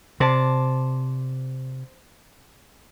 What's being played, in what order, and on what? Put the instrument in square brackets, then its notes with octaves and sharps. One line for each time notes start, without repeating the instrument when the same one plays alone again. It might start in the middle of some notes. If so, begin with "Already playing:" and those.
[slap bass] C3 [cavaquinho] C5 D5 A5